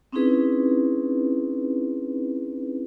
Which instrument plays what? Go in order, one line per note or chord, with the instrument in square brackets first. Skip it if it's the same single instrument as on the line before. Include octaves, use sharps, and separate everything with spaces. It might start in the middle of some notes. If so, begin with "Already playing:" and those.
[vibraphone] C4 C#4 D#4 E4 G#4 B4